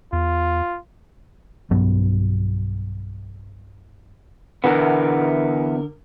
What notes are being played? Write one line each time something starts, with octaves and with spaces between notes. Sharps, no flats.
E2 F4
B1 G2 F#3 B3
E2 D3 B3 A#4